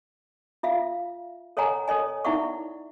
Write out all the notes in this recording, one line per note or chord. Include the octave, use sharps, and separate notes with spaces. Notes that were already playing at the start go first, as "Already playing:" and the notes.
F4 E5 F5
A4 C#5 D#5 F#5 G#5 A#5
A4 C#5 D#5 G#5
D#4 E4 D5 E5 F#5 C#6